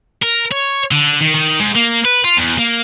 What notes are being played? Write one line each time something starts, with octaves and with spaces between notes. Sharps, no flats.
A#4
C#5
D3
D#3
D#3
G#2
A#3
B4
F4
E2
A#3